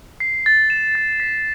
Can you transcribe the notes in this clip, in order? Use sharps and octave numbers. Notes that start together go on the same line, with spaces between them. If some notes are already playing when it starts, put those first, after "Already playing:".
C7
A6
E7
A6
B6